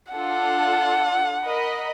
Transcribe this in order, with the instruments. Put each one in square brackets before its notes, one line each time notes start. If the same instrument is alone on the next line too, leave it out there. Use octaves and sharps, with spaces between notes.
[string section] D4 F4 A4 [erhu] F#5
[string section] A#4 D#5 B5